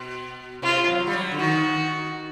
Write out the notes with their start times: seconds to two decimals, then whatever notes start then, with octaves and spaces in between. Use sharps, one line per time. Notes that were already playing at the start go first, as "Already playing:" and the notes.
Already playing: B2
0.62 C3 F4
0.88 F#3
1.07 G3
1.13 F#3
1.32 D3
1.39 D#3 F#4